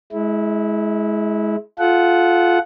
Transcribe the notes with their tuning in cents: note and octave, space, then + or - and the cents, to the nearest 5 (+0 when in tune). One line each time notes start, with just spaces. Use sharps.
G#3 +25 E4 -15
F4 +0 A4 -35 F#5 +0